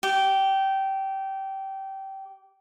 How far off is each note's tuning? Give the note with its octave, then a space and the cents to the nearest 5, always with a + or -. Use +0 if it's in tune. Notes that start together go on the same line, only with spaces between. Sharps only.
G4 -20